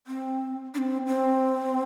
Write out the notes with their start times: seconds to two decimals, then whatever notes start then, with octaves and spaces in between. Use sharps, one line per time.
0.07 C4
0.74 D4
0.78 C4
1.07 C4